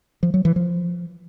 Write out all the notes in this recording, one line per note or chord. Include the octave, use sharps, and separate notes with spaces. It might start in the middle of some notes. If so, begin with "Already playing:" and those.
F3
F#3
E3
F3